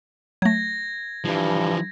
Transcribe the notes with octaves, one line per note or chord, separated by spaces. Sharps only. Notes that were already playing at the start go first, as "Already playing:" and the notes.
F#3 A3 G#6 A#6
G2 E3 F3